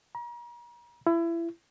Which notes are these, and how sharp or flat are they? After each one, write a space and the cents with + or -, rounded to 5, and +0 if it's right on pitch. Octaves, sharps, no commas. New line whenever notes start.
A#5 +40
E4 +25